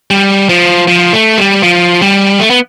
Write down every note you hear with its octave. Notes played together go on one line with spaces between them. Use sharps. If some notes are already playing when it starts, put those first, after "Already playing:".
G3
F3
F3
A3
G3
F3
G3
A3
B3